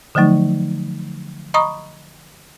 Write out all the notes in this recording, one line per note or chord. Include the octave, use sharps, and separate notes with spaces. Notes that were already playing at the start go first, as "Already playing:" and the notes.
D3 F3 F#3 A3 D#4
D#5 A#5 B5 C#6 D#6